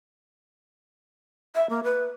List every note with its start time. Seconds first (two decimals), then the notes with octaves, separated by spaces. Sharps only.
1.55 E5
1.70 A#3
1.84 B4